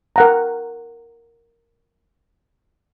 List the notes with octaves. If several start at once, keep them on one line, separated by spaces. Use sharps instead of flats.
A#4 F#5 A#5